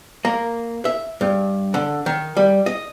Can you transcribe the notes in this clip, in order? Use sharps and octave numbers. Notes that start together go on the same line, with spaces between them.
A#3
E5
G2
D3
D#3
G3
D#5